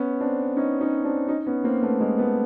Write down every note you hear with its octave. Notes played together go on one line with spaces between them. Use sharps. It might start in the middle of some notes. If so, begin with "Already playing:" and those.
Already playing: B3 C#4
C4 D4
C#4 D#4
C#4 D#4
C4 D4
C#4 D#4
B3 C#4
A#3 C4
A3 B3
G#3 A#3
A3 B3